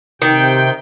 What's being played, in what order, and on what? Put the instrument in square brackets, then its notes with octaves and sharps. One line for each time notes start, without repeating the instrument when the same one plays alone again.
[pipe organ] C3 G5 [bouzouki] D#3